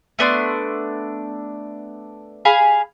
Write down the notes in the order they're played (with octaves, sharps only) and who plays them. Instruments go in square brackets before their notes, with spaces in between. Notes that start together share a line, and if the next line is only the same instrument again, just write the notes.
[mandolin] A3 B3 D4 C6
G#4 F5 B5